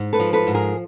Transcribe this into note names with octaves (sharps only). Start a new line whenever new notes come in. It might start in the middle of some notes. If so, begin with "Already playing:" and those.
Already playing: G#2
A4 B4
F3
A4 B4
G#2
G#4 A#4